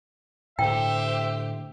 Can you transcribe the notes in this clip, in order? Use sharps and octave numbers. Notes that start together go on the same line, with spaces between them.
A2 D3 G4 C5 E5 G5